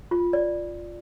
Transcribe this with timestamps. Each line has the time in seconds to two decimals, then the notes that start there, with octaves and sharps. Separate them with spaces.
0.11 F4
0.33 D5